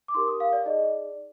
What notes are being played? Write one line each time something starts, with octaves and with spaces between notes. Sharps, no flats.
D6
D#4 G4 A#4 C6
D#6
F5
D5
D#4 G#4 D5 D#5